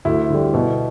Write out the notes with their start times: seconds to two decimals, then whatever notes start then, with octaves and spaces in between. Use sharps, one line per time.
0.05 D2 E4
0.30 D3 G3
0.54 B2